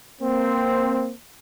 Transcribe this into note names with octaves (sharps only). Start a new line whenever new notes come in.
A#3 C4